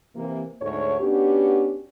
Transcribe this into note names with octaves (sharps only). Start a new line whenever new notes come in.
C3 E3 A#3
D2 G#2 C#5
B3 C#4 D4 F#4 G4